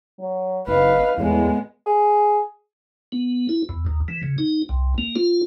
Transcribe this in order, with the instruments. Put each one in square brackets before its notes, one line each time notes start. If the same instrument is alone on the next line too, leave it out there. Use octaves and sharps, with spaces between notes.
[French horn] F#3
[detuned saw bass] F#1 [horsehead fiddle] B4 F5 [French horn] D#5
[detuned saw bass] E2 [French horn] A2 [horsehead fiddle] G#3 B3
[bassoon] G#4
[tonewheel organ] B3
E4
E2
D#2
E3
C#3
D#4
C2
A#3
F4